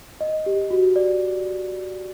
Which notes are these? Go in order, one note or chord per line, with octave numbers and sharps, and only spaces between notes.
D#5
G4
F#4
D5